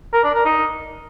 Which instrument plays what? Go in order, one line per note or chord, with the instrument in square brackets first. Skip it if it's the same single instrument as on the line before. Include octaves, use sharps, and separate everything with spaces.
[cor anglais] A#4
D4
A#4
D#4